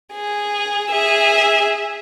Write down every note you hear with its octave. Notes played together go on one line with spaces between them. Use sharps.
G#4
G#4 E5